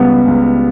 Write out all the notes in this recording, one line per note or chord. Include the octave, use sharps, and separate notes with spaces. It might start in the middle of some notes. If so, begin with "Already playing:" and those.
Already playing: C#2 G3 B3
C#2